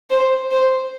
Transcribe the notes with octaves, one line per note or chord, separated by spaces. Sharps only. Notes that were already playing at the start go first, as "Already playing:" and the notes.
C5
C5